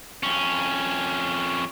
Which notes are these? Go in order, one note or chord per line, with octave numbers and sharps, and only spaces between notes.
F2 C#4